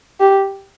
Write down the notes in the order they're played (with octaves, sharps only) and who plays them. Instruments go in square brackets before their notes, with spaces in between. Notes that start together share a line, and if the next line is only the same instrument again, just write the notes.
[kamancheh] G4